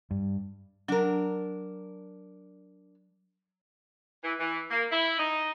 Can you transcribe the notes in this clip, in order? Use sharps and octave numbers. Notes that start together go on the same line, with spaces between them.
G2
F#3 D4 A#4
E3
E3
A#3
E4
D#4